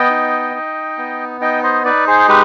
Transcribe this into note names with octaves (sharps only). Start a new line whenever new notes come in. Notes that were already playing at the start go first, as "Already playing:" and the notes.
Already playing: B3 D#5 G5
D#4
D#4
B3
D#4 D#5 G5
C5 D#5
D#4 B4 D5
G#4 C5
G#3 G4 B4